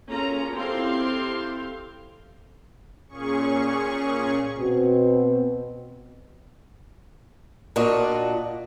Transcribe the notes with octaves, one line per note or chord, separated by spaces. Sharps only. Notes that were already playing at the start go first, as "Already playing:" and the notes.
A#3 C#4 F4 G#4 A4 A#5
C4 E4 G4 A4 F5 C6
A#2 C#4 G#4 C#6
B2 C4
A#2 D4 F#4 D#5